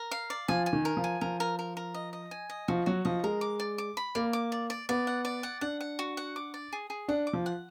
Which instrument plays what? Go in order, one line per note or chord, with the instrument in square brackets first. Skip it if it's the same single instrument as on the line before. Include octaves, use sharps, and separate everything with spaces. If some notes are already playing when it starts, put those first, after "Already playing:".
Already playing: [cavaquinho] A#4
F5
D5
[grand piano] F3 [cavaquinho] G#5
[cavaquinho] G#5
[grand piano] D#3
[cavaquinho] A#4
[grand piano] F3
[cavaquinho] G#5
[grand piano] F3 [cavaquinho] A#4
[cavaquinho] A#4
A#4
A#4
D#5
D#5
G#5
D#5
[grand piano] F3 [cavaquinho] F#4
[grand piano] F#3 [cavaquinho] F#4
[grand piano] F3 [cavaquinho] D#5
[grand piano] G#3 [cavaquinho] A#4
[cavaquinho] D6
D5
D6
B5
[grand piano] A#3 [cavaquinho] D5
[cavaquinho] D6
D5
D5
[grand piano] B3 [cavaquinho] D5
[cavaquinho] F#5
D5
F#5
[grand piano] D4 [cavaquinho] F#5
[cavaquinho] F#5
F#4
F#5
D6
D5
G#4
G#4
[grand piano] D4 [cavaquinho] F#5
[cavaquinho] D6
[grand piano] F3
[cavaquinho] F#5